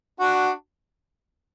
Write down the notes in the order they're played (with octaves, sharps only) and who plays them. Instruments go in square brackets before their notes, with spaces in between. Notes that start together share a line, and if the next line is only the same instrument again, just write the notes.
[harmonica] D4 F#4